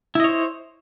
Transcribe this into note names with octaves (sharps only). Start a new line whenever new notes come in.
E4 C5 C#5 D#5